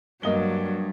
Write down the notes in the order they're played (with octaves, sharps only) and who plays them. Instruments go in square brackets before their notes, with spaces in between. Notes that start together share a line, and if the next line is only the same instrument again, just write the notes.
[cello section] G2 [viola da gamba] F#3 [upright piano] A#3 D#5 G7